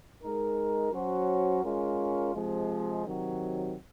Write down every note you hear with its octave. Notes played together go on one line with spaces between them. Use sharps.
G#3 D#4 A#4
F#3 C#4 F#4 C5
G#3 C#4 F4 A#4
C3 F3 G#3
C3 D#3 F#3